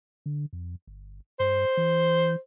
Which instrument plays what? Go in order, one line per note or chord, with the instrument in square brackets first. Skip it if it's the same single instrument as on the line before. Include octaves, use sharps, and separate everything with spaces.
[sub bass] D3
F2
G1
[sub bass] G2 [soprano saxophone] C5
[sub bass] E3